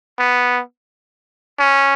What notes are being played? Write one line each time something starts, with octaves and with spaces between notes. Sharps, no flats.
B3
C#4